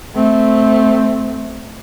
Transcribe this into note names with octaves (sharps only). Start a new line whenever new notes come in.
A3 C4